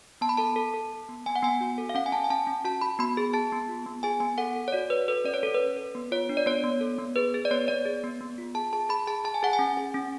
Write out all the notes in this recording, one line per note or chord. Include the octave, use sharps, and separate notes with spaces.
B3 A5
B5
A4 A5
A4
A4
A4
B3
B3 G#5
F#5
B3 G#5
F#4
A4
F5
C#4 F#5
G#5
C#4 A5
G#5
C#4 A5
C#4
F#4 A5
F#4 B5
B3 B5
G#4
G#4 A5
B3
F4
B3
G#4 G#5
B3 G#5
A4 F#5
A4
C#5
F#4 D5
F#4 B4
A4 B4
C#4 D5
C#5
C#4 A4
B4
A4
A4
B3
F4 C#5
D4
D5
B3 C#5
B3
A4
B3
G#4 B4
G#4
D5
B3 C#5
B3 D5
G#4
B3
B3
F4
G#4 A5
G#4 A5
G#4 B5
G#4 A5
G#4 A5
G#5
G#4 F#5
G#5
C#4
G#4
C#4